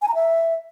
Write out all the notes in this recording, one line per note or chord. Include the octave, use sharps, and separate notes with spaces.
G#5
A#5
E5